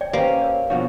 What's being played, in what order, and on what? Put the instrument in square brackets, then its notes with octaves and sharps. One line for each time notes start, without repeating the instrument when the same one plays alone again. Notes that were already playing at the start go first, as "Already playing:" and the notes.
[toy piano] C#5 D5 G5
[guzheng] A#3 [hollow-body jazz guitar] C#4 G4 [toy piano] B4 C5 D5
[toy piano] A#4 C#5
[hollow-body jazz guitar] B2 F3 F#4 [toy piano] D4 C#5 F5